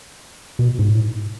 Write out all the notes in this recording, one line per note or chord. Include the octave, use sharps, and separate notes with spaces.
B2
G#2
A2